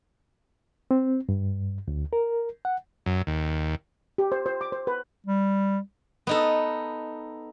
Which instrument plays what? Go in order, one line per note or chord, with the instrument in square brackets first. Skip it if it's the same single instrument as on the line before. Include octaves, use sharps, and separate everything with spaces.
[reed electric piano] C4
G2
D2
A#4
F#5
[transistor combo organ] F#2
D#2
[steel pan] G4
C5
C5
D6
C5
B4
[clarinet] G3
[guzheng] B3 D#4 A4